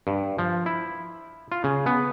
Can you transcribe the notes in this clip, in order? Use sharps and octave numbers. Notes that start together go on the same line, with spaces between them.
G2
F3
E4
F4
C#3
B3